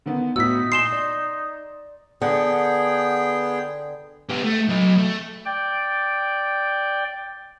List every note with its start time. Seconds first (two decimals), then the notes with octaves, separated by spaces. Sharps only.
0.06 D3 D#3 B3
0.36 A2 B3 D#4 E4 F#4 E6 B6
0.72 A#2 D#5 G#5 C6 C7 E7 G7
0.93 D5
2.22 D3 B3 G#4 F#5 G5
4.30 B3 G4
4.44 A3
4.70 F#3 D#5
4.99 A3
5.45 D5 G5